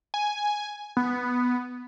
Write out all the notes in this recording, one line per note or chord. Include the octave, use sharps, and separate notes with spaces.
G#5
B3